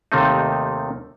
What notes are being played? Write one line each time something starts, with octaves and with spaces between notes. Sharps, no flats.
D#2 C3 D#3 A3 C4 D#4